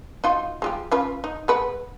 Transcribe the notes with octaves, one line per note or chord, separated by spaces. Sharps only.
D#4 F4 F#4
G#3 F4 G4
C#4 F4 B4
D#4
G#3 B4 F#5